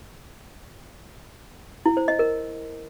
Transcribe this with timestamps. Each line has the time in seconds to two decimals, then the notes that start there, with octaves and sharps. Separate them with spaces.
1.86 E4
1.97 C5
2.08 D#5
2.19 A#4